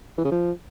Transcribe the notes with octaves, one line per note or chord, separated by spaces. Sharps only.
E3
C#3
F3